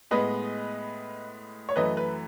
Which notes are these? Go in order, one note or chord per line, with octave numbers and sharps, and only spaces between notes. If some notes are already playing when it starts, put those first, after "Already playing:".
A2 G#3 B3 B4 D#5
C#5
F#2 E3 A3 B4 D#5
B4